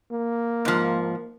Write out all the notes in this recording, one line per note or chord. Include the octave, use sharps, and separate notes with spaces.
A#3
G#2 F3